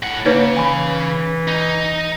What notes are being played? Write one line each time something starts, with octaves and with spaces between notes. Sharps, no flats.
A2 F#5
C#3 A#3 D#4 B4 C#5
E3 G#5 B5
D#4